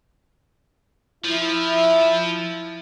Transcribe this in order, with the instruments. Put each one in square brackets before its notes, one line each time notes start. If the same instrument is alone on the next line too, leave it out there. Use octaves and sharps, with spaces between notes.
[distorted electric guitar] F3 [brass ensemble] E4